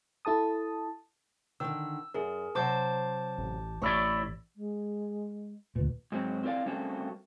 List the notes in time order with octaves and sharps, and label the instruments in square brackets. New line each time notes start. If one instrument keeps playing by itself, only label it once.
[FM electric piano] E4 A4 A5 D#6
[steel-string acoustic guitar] D3 D#3 [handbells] E6
[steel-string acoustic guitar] F#2 [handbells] G#4 A#4
[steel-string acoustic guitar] C3 F#3 C5 [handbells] A5 D6 G6
[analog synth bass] A1
[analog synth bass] A1 [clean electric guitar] A2 E4 D5 [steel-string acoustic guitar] C#5
[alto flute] G#3
[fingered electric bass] D2 A#2 [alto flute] B4
[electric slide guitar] G#2 F#3 C4
C4 E4 A#4 D5 F5
G3 A3 A#3 C4 C#4 F#4